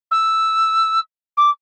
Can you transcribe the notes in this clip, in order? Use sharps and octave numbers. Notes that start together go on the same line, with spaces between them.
E6
D6